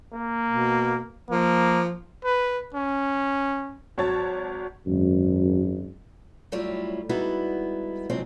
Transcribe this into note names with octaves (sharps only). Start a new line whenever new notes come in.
A#3
B2
F3 A#3
B4
C#4
G#1 F#3 C#5 A5 A6
G#1 F#2
A2 F#3 G3 E4 F4 G4
G3 G#3 B3 D#4 E4 F#4
F2 G#2 C3 F#3 G#3 C4